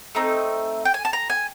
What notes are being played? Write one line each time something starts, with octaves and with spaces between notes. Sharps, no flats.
A3 C4 D#4
G5
G#5
A5
A#5
G#5